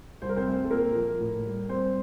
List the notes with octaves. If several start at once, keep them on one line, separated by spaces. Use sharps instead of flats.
C2 C5
A#4
C4 C5
A3
A4
A#2 A#3 A#4
F3
A2
G3
G3 C4 C5